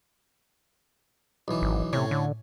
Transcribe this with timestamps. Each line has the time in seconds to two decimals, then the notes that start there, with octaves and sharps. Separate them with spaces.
1.48 B1 E3
1.62 G#1
1.93 A2 C3 C#4
2.11 D3